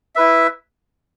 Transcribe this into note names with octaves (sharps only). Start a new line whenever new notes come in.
E4 B4 E5